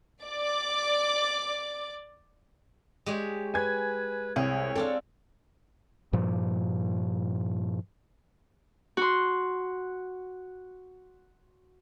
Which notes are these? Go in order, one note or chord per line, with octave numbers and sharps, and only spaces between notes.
D5 D6
G#3 G4 C#5
B4 G#5 G#6
C2 G#4 C#5
C4 D4 A4 F5
G2 A#2 F3
F#4 C6